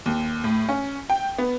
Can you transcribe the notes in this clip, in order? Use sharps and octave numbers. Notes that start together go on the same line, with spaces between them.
D#2
A2
C#4
G5
B3